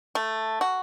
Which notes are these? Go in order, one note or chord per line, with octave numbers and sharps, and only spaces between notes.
A3
F#4